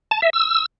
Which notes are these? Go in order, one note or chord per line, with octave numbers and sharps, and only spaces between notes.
A5
E5
E6